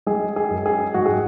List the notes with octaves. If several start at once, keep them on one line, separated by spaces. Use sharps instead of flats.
G#3 G#4
G#4
F#2
G#4
G#2 F#4
G#4